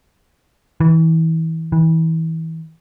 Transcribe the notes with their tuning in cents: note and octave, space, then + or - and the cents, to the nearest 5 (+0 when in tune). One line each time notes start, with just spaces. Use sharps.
E3 -30
E3 -30